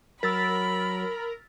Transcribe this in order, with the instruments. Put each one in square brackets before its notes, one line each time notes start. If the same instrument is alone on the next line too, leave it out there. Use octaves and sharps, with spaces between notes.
[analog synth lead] F#3 [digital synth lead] A#4 [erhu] B5 [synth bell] E6 A6 B6